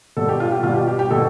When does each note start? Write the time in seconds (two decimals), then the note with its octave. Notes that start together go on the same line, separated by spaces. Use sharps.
0.17 B2 G3 A4
0.29 G4
0.40 F4
0.51 G4
0.63 B2 G3 F4
0.75 G4
0.88 G4
0.99 G4
1.11 B2 G3 A4